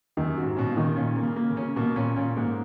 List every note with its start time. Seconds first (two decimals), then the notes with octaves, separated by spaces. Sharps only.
0.17 F#2 D#3
0.37 F#4
0.43 G#2
0.57 B2 C#4
0.70 A#2
0.77 D#3
0.96 A#2 C#4
1.16 A#3
1.23 C#3
1.36 A#3
1.50 C#3
1.57 C#4
1.76 B2 A#3
1.96 A#2 C#4
2.16 A#2 C#4
2.37 G#2 A#3